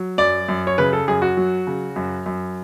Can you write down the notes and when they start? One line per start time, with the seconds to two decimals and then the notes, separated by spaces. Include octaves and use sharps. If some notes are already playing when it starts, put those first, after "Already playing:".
Already playing: F#3
0.18 F#2 D5
0.49 F#2
0.67 C#5
0.78 C#3 B4
0.93 A4
1.08 F#2 G#4
1.22 F#4
1.37 F#3
1.67 C#3
1.96 F#2
2.26 F#2